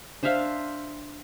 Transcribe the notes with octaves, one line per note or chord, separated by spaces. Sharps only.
D4 C5 E5 F5